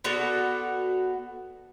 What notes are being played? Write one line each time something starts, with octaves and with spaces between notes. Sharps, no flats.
B3 F#4 A4 D5